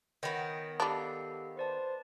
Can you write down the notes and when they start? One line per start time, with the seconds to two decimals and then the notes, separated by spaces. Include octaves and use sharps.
0.23 D#3 B3 C#5 D#5 G5
0.80 G3 D4 G4 A4 F5
1.57 B4 C5 D5 A5